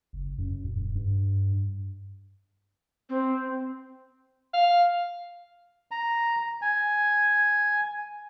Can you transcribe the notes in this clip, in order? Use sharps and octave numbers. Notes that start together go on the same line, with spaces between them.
F#1
F#2
D#1
G2
C4
F5
A#5
G#5